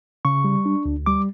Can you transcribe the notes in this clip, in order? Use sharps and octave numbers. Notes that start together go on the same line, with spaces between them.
C#3 C#6
G3
D4
D2
G3 D6